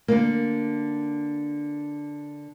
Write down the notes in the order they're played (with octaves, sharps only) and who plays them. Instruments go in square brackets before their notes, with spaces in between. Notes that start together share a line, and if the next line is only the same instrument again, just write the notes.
[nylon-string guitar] D3 A#3